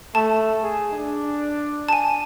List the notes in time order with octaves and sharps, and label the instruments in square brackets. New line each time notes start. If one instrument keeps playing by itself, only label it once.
[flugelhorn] A3 [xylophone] A5
[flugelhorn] G#4
D4
[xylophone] G#5 A5